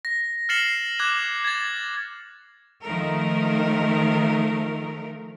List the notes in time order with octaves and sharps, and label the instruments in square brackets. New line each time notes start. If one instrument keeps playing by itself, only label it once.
[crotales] A#6
F6 A6 C7 C#7 E7 F#7
D6 F#6 G#6 E7
G#6 A6
[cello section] D#3 F3 A3 A#4